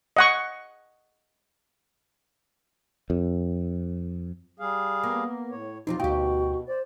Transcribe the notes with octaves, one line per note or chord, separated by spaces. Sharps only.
D#5 F#5 C#6
F2
G3 G#4 F5
A#3 B3
A2 C#5
E2 F3 C4 D#4 F4 G4
D2 B2 D#4 F#4 G4 G5
C5 D5